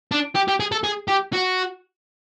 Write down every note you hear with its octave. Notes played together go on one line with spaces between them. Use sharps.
D4
G4
G4
G#4
A4
G#4
G4
F#4